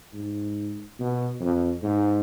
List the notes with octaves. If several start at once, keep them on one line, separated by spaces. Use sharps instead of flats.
G#2
B2
F2
G#2